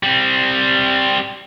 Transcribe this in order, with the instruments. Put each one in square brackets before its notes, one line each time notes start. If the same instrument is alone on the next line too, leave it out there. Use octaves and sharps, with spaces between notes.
[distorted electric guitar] G3 C4